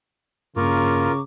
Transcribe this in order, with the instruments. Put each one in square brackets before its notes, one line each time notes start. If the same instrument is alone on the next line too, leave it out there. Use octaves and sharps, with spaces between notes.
[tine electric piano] G2 A#3 [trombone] C#3 [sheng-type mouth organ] F4 A#4 [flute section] A#5 C#6 D6